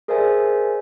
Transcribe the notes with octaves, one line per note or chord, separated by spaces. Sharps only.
G#4 A#4 C5 D5 E5 G#5